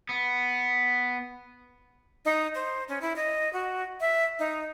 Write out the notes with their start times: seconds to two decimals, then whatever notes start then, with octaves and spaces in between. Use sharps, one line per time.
0.09 B3
2.25 D#4
2.55 C5
2.88 C#4
3.01 E4
3.16 D#5
3.53 F#4
4.00 E5
4.39 D#4